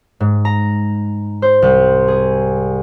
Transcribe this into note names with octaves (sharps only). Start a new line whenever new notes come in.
G#2
A#5
C5
C2
G#4